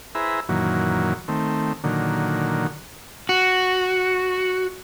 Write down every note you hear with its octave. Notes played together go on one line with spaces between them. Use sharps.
E4 G#4 B4 C5 E5 A#5
F#2 A#2 D#3 E3 F#3
D#3 A3 C4
A#2 D3 D#3 F#3
F#4